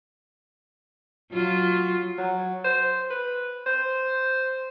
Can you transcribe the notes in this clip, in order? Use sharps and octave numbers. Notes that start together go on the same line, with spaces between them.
F#3 F4
F#3
C5
B4
C5